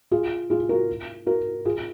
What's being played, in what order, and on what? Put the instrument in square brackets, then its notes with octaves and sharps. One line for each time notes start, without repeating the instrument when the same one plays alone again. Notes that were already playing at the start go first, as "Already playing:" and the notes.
[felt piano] F4 G#4
F4 G#4
F#4 A#4
F#4 A#4
F4 G#4